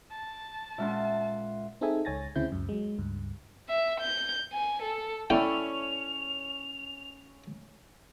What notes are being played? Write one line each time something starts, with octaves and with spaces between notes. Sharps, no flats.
A5
A#2 G#3 C#4 E5 F#5 C6
C4 D#4 G#4 A4 E5 G#5
C#2 C#5 G#5 A6 A#6
D2 C#3 C4 E4 G6
C#2 F#2
F#3 G#3
C#2 G2
E5
G6
G#5
A4
C#4 E4 A4 D5 G5 F7